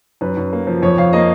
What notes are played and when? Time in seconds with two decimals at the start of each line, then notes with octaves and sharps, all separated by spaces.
0.21 F#2 B4
0.37 F#2
0.53 A#3
0.67 F3
0.82 F2 C#5
0.98 F2 F5
1.13 A#3 D#5